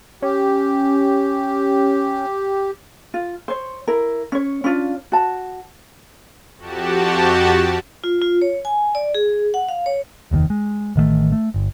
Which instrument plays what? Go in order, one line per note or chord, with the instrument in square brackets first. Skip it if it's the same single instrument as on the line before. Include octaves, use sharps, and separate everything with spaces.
[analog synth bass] C#4 [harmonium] G4
[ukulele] F4
C5 C#5
E4 A#4
C#4 C#5
C#4 D4 F4
F#4 A5
[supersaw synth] F2 F#4 G4 A5
[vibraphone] F4
F4
C#5
G#5
D5
G#4
F#5
F5
C#5
[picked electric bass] F1 D#2 A2 D#3
G#3
A1 D#3 F#3 A3
A3
G1